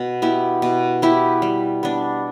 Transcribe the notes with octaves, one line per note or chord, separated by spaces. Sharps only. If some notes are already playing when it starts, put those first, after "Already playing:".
Already playing: B2
B3 E4 G4
B2
B3 E4 G4
G3
B3 D4